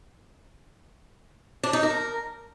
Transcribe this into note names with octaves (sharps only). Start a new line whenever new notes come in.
D4
D#4
A#4